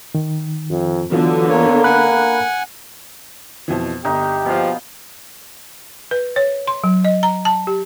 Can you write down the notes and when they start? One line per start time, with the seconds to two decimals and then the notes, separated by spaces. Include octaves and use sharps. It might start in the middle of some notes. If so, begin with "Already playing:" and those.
0.15 D#3
0.70 F2
1.12 D3 E3 F#3 B3 F4
1.50 A#3 C#5
1.84 F#5 G#5 B5 F#6
3.68 F2 B2 E3
4.05 G1 D#4 G4
4.46 B2 F3 F5
6.11 B4
6.36 C#5
6.68 C6
6.84 F#3
7.04 D#5
7.23 A#5
7.45 A5
7.67 G4